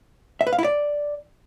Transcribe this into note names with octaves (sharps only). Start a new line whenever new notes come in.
E5
B4
F5
E4
D5